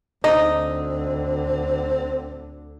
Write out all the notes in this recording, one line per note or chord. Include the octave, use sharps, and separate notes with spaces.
D2 D3 C4 D#4 D#5